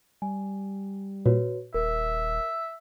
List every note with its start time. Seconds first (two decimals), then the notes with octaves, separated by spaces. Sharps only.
0.22 G3 G#5
1.26 A#2 F#4 B4 C#5
1.74 D#1 A#4 E5